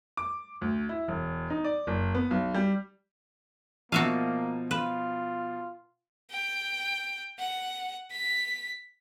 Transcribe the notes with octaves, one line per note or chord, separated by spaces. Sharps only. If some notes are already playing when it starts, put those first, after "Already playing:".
D6
D2
E4
E1
D#4
D5
F#1
B3
B1
G3
B2 F3 A#3 F#4 E5 F5 D#7
F4 B4
G5
F#5
B6